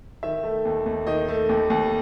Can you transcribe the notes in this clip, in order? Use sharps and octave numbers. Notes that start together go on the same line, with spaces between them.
D#3 E5
A3
D#2
D#2
D#3 D#5
A3
D#2
D#2